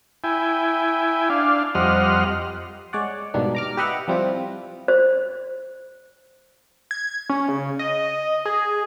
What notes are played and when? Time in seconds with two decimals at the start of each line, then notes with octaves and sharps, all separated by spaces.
0.24 E4 G5 G#5
1.30 D4 F5
1.75 F2 G3 C5 D#5 F#5 F6
2.93 G#3 C#5 D5 F#5
3.34 G#2 B2 D#3 G3 A#3 D4
3.55 A#5 D6 F6
3.77 G4 B4 D#5 E5 F#5
4.08 F3 G3 C4 E4 F4
4.88 C5
6.91 G#6
7.30 C#4
7.48 C#3
7.79 D#5
8.45 G#4